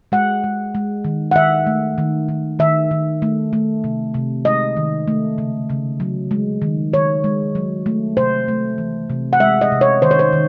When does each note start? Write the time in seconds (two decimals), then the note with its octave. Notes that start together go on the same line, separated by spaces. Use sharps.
0.12 G#3 F#5
0.44 G#3
0.75 G#3
1.05 D#3
1.31 F#5
1.36 D#3 E5
1.67 A3
1.98 D#3
2.29 D#3
2.59 D#3 E5
2.91 D#3
3.22 A3
3.53 A3
3.84 C3
4.14 C3
4.45 G#3 D#5
4.77 D#3
5.08 A3
5.38 C#3
5.70 C#3
6.00 F#3
6.31 G#3
6.62 D#3
6.93 D#3 C#5
7.24 G#3
7.55 F#3
7.86 A3
8.17 C3 C5
8.48 A3
8.78 E3
9.10 C3
9.33 F#5
9.40 G#3 E5
9.61 D#5
9.72 C3
9.81 C#5
10.02 D#3 C5
10.11 C#5
10.19 C5
10.33 D#3